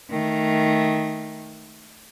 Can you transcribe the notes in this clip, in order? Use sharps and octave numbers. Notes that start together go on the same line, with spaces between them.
D#3 A3